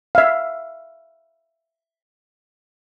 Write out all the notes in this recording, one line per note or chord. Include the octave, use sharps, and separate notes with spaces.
E5 F5